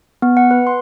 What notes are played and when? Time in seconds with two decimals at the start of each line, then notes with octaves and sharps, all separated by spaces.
0.22 B3
0.37 F#5
0.51 B4
0.67 C6